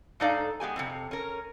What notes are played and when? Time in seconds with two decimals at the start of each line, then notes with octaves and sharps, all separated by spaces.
0.20 G#2 D4 D#4 A4 D5 F5
0.60 G#3 B3 G4 G#5
0.76 F2 A2 C3
1.11 C#4 A#4